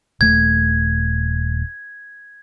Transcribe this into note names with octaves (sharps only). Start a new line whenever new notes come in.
D#1 A3 G#6